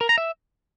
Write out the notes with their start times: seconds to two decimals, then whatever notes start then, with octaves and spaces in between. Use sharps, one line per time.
0.01 A#4
0.09 A#5
0.18 E5